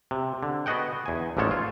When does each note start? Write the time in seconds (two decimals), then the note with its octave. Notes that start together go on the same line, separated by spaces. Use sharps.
0.11 C3
0.43 D3
0.66 B3 F#4 G#4 D#5 F#5 G5
1.06 E2 G#5
1.37 A1 G#2 F3 D4 A4 C#5
1.51 F4